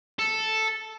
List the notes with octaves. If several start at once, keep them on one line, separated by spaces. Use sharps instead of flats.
A4